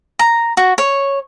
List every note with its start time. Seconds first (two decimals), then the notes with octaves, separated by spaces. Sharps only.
0.19 A#5
0.57 F#4
0.78 C#5